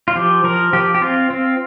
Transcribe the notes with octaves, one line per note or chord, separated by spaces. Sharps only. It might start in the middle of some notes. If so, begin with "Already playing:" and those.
F4
F3 G4
F3 A#4
F3 G4
G4
C4 F4
C4